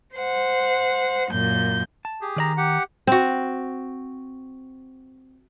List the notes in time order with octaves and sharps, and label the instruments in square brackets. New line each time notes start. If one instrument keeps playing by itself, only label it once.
[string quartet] C5 F#5
F#2 A#2 G6
[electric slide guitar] A5
[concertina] G4 G#4
[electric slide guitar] D#3 D5 A#5
[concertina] G4 F#5
[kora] C4 F#4